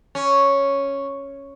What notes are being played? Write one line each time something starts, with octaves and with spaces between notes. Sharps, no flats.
C#4